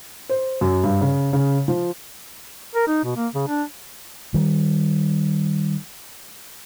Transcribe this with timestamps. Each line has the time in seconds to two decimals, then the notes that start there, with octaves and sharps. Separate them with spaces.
0.29 C5
0.61 F#2
0.84 G2
1.01 C#3
1.33 C#3
1.68 F3
2.75 A#4
2.87 D#4
3.04 B2
3.16 A#3
3.35 C#3
3.48 D4
4.34 D#3 G3